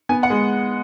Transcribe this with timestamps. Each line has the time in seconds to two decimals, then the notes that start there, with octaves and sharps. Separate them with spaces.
0.09 B3 G#5
0.23 F#5
0.30 G#3